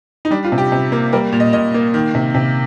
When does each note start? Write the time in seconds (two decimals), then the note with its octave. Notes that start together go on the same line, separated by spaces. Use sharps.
0.25 D#4
0.31 G3 D4
0.45 F4
0.52 C3
0.58 G4
0.72 C3
0.92 A#3
1.13 G3 A#4
1.32 A#2
1.40 D#5
1.53 A#2 D#5
1.74 A#3
1.94 D#3
2.15 C3
2.34 C3